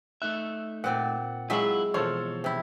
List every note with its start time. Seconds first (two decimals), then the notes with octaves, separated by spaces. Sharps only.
0.22 A3 D#4 E5 F#6
0.84 A#2 C4 D5 F#5
1.50 F#3 G#3 E4 F4 E5
1.94 B2 E3 F3 F4 A4 C5 C#5
2.44 C3 E4